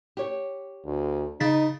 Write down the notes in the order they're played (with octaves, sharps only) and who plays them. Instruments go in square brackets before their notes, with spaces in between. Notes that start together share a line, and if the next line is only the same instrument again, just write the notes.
[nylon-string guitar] G4 C#5
[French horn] D2
[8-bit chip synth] C#3 A6 B6 [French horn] D#4